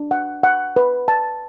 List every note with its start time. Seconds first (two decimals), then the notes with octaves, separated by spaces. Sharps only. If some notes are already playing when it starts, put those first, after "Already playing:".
Already playing: D4
0.11 F#5
0.43 F#5
0.76 B4
1.08 A5